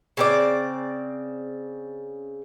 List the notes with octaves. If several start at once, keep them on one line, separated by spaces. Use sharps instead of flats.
C#3 C4 D5